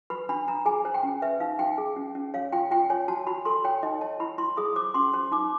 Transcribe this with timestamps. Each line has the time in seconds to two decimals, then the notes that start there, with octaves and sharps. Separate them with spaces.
0.10 B4 B5
0.29 D4 B5
0.48 D4 A#5
0.65 G#4 G#5
0.85 C5
0.94 G5
1.03 C#4
1.22 B4 E5
1.40 D#4 F5
1.59 D#4 G5
1.78 G#4
1.97 C#4
2.15 C#4
2.34 C#5 F5
2.52 F4 G5
2.71 F4 G5
2.90 C#5 G#5
3.08 F#4 A5
3.27 F#4 B5
3.45 A4 C6
3.64 C#5 G5
3.83 D#4 D#5
4.01 C#5 A5
4.20 E4 B5
4.38 E4 C6
4.57 G#4 D#6
4.76 C5 D6
4.94 C#4 C6
5.13 C5 C6
5.32 D#4 D6